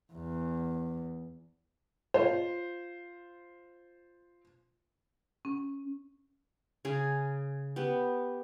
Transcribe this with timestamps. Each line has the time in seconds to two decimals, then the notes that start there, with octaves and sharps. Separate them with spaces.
0.13 E2
2.14 F4 C5
5.45 C#4
6.85 C#3 G#4
7.76 B3 G4